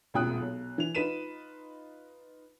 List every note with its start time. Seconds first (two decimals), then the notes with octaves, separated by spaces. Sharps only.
0.14 E1 C2 A#2 G5 D#6 F#6
0.40 B1
0.78 E3 F7
0.95 D#4 F4 B4 B6 D#7 E7